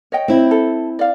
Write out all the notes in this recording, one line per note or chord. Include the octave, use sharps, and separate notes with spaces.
C#5 D#5 G5
C4 E4
A4
D5 F5